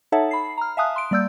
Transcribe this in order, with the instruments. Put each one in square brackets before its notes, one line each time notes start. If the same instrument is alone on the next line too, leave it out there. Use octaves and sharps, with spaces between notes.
[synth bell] D#4 A4 C#5 E5 F#5 A5
B5 C7
A#5 F6
E5 F5 G#5 A5 D#6 F#6
C6 D7
G3 A#3 D5 E6 G6